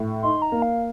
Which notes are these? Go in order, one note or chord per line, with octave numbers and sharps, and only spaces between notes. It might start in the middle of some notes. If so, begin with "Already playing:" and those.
Already playing: A2
D#4 C6
A#5
A#3
F5